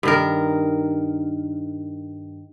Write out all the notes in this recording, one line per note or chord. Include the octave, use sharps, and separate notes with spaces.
G2 D#3 A#4